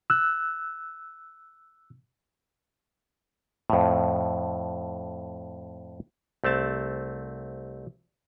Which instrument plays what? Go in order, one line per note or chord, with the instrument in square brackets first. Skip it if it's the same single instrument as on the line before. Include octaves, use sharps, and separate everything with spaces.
[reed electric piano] E6 F#6
[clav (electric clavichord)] F2 A2
C2 A3 C4 A5